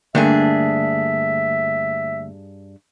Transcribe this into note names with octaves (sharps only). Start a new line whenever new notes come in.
G2 D3 A3 A#3 D4 G#4 E5